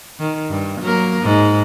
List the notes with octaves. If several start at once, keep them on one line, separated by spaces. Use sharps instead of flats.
D#3
G2
F#3 A#3 A#4
G#2